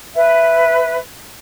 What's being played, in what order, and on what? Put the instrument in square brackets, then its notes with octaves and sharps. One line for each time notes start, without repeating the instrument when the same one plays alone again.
[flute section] B4 E5